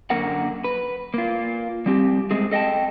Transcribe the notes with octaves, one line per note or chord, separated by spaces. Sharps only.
F#2 D3 A#3 A#4 F#5
B4
A#3 F4
G3 C4 G4
G#3 A3 C4 G#4
A4 D#5 F#5 G5 A5